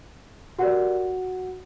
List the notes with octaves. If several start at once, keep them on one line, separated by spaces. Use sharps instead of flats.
F#4 G4 A#4 D5 F#5